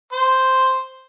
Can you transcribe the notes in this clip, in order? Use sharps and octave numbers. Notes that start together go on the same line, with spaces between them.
C5